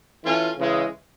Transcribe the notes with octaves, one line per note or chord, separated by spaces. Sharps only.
E3 A3 C#4 F4
C#3 E3 G#3